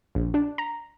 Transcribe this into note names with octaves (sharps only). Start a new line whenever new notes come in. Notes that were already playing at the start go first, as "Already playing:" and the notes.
A#1
D4
A#5